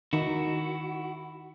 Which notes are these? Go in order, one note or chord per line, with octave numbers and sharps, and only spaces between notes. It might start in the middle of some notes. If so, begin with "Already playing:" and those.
D#3 D#4 E4 F#4